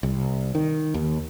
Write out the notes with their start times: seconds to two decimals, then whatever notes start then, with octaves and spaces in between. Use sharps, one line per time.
0.03 C2
0.55 D#3
0.94 D#2